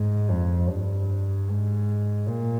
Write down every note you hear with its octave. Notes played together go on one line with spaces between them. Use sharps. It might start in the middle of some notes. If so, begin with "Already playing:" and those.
Already playing: G#2
F2
G2
G#2
A#2